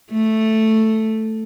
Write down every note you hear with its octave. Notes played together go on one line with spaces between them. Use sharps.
A3